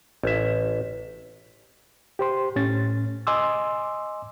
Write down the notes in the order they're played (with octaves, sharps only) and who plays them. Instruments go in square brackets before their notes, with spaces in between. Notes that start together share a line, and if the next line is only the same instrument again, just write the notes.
[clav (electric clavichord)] A1 E5
[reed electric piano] G4 C5 C6
A2 C#4 A6
D#5 G#5 C6 D6 E6